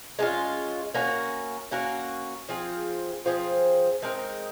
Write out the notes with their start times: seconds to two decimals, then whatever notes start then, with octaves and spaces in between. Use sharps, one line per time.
0.19 G#3 C#4 F4
0.94 A#3 C#4 F#4
1.71 A#3 C#4 F#4
2.49 F3 C4 F4 G#4
3.26 F3 C4 F4 G#4
4.02 G#3 C4 D#4 A#4